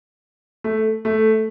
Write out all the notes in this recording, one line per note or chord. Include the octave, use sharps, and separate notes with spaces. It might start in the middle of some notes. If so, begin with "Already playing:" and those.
A3
A3